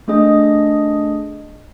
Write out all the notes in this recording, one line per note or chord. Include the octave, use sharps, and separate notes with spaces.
A3 D4 G#4 D#5